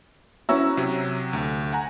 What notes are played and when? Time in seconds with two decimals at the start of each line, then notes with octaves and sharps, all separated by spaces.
0.49 C#4 E4 F#4 A#5 E6
0.77 C3 F#3
1.33 D2
1.72 F#5 G#5 A#5